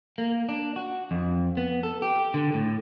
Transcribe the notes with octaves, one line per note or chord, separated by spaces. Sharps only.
A#3
D4
F#4
F2
B3
A4
G4
D3
A2